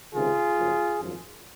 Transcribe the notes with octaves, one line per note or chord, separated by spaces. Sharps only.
C#2 C3 D#3 F4 G#4
F#1 F#2 F3
G#1 F#2 F3